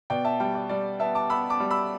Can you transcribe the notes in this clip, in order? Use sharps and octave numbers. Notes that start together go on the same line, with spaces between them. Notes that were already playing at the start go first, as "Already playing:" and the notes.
B2 D5 G5
E5 A5
G3 D5 G5
D5
G3 D5
B3 E5 A5
A5 D6
B3 B5 E6
A5 D6
G3
B5 E6